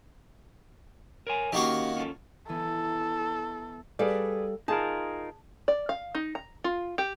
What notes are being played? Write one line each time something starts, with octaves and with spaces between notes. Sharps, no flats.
A#4 C#5 G#5
D#3 A#3 C#4 F#4 G4
C#4 F4 A4
E3 B3 A4
G3 G#4 A4 B4 D5 F5
D#4 F4 G#4 A#4 A5
D5
F5
D#4
A#5
F4
G4